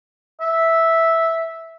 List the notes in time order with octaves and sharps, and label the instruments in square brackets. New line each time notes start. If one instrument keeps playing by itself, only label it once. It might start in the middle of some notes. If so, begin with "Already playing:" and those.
[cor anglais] E5